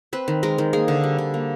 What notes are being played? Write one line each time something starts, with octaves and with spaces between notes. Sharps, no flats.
C4 B4
D#3
G#3 A#4
D#3
A#3 G#4
D3
G3
D3
A#3